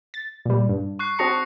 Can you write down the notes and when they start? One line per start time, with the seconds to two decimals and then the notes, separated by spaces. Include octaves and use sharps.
0.14 A6
0.46 A#2 G3
0.69 G2
0.99 C#6 F#6 C7
1.19 C4 F#4 A5 D#6 A#6 C#7